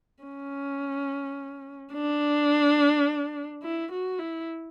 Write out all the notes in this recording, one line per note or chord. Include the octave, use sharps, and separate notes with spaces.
C#4
D4
E4
F#4
E4